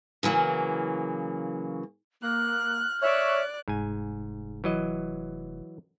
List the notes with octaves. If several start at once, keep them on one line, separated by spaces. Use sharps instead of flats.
C#3 E3 F#3 A#3
A#3 F6 F#6
C#5 D5 E5 F#6
F1 G#2 G#5
E3 F#3 D#5